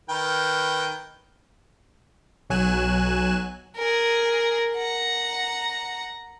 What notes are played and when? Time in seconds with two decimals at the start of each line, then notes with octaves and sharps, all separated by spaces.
0.09 D#3 B4 G5
2.50 B1 F#3 G#5 F#6 E7
3.76 G#4 A#4
4.76 F#5 A#5